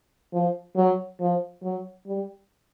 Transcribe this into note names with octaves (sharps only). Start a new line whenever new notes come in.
F3
F#3
F3
F#3
G3